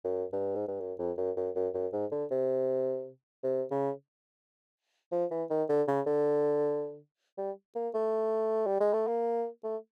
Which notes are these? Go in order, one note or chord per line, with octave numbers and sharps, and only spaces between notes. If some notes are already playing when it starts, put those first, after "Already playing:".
F#2
G2
G#2
G2
F#2
F2
F#2
F#2
F#2
F#2
G#2
D3
C3
C3
C#3
F3
E3
D#3
D3
C#3
D3
G3
A#3
A3
G3
G#3
A3
A#3
A3